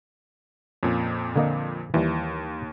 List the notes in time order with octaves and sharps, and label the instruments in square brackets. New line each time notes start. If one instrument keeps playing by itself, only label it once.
[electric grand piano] F2 A#2 [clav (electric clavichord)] C#4
[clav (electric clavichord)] D3 A#3 D#5
[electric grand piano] D#2 [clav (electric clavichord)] E3 G3